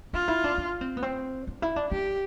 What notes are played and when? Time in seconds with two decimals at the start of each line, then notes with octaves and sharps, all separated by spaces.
0.13 D4 F4
0.28 E4
0.44 D4
0.58 D4
0.81 C4
0.97 B3
1.03 C4
1.47 D4
1.62 E4
1.76 D4
1.91 D4 G4